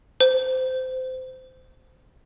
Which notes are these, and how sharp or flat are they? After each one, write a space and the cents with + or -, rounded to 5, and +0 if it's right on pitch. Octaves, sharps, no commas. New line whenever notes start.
C5 -20